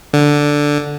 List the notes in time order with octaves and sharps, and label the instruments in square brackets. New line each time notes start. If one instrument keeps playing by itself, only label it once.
[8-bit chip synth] D3